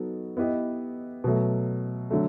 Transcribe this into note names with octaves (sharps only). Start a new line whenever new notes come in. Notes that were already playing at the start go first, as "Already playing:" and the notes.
Already playing: F#3 B3 D#4 F#4 A4
B3 E4 G4 B4 D#5
B2 F#3 A3
D3 F#3 A3